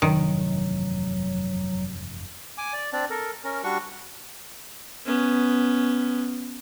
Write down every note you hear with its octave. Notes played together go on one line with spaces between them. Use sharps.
F1 E2 G2 D#3 F#3
G#5 D6
D5
C4 D4 D5
A4 A#4
C#4 A#4
G3 D4 F#4 C#6
B3 C#4